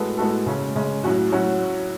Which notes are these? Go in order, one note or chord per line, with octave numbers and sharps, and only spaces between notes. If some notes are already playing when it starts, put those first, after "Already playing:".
Already playing: A2 G#3 B3 F#4 A4
A2 G#3 B3 F#4 A4
C#3 G#3 C#4
C#3 G#3 C#4
A2 F#3 C#4 F#4
A2 F#3 C#4 F#4